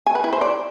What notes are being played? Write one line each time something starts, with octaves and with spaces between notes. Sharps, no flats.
G#5
B4
E4
C5
D5